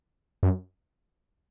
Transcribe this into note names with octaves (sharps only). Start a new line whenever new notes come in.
F#2